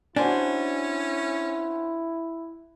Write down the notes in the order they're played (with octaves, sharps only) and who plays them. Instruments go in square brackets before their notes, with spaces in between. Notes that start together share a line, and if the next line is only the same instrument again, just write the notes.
[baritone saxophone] C#4 [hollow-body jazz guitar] D4 [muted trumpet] E4 [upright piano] F#4 C5 G#5